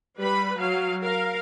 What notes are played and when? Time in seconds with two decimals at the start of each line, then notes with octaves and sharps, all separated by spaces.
0.18 G3 B4 B5
0.59 F#3 F5
1.02 A#4 F5